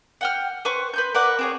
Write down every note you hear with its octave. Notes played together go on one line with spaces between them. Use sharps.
F#5 G5 F6
B4 C5 C#6
B4 C6 G6
A#4 B4 D5 F#5
C4 G#4 C#5